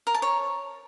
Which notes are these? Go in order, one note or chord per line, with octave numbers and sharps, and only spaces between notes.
A#4
A5
C#5